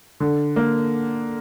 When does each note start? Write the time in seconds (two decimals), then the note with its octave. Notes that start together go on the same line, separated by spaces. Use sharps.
0.20 D3
0.56 A#3